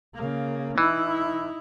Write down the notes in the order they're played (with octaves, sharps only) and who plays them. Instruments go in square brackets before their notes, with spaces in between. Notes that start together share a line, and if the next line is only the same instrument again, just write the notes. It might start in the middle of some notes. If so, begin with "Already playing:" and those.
[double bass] C#3 A#3
[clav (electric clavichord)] E3 [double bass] D#4 E4